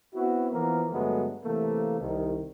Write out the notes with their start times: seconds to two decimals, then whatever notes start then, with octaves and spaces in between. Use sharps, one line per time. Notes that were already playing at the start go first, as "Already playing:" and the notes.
0.14 B3 C4 E4 F#4
0.52 E3 F3 A#3 B3 A#4
0.91 G2 D3 F#3 G#3 A3 B3
1.44 C3 E3 A3 A#3
2.00 C2 D#3